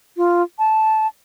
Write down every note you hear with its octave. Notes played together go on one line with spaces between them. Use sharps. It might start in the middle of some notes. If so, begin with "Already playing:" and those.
F4
A5